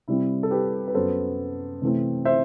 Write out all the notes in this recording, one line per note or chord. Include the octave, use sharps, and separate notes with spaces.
C3 G3 C4 E4
A4
G4 B4
B4
F#2 F#3 B3 A4 C5
C3 E3 A3 C4
C5 E5